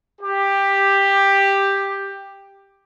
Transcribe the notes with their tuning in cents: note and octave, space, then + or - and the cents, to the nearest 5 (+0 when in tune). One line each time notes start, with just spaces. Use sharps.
G4 +10